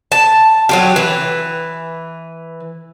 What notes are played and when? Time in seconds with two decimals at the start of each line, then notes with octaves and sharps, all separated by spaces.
0.12 A5
0.69 F#3 F4 G4
0.96 E3